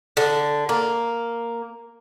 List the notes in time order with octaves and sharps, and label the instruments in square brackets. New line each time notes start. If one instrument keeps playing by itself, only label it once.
[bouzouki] D3
A#3